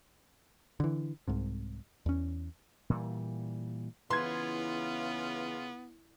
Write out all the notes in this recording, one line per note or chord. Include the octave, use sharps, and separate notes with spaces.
D3 E3
C2 G#2 C3
E2 C#4
A#2 E3 G3
C#3 E3 B3 F4 C6 G#6